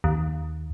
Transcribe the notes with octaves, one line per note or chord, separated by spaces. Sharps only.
D#2